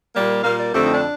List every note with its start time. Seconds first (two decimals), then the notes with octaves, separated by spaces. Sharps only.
0.14 A#2 G3 A#3
0.44 A#2 G3 A#3 F5
0.59 D5
0.73 F2 D3 A3 C4 G4
0.83 D#4
0.93 D4